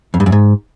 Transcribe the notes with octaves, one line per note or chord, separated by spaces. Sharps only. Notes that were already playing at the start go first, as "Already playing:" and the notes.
F2
G2
F#2
G#2